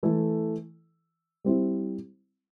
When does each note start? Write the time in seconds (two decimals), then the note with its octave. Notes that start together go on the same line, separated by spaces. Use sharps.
0.03 E3 A3 E4 A4
1.44 G3 C4 E4